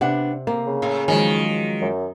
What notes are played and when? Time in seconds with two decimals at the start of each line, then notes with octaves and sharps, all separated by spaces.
0.01 C3 B3 D4 F#5
0.47 C3 A#3
0.67 C#3
0.82 A2 F5 G#5
1.08 D#3 F3 F#3 G#3 C#4
1.81 F#2